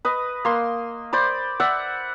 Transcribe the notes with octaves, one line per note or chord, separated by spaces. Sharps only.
B4 D#5
A#3 C6
C5 D5 B5
D5 E5 F#5